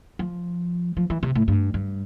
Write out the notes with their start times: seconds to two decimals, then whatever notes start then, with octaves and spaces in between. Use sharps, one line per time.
0.19 F3
0.97 F3
1.10 E3
1.23 C3
1.35 A2
1.48 G2
1.74 G2